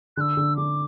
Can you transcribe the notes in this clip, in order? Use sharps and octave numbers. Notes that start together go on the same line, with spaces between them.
D3 E6 F#6
D3
D3 D6